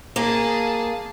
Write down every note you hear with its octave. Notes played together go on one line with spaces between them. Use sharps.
A#3 G#4 A5